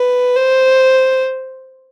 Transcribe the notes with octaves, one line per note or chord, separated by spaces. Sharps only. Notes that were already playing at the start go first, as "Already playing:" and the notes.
Already playing: B4
C5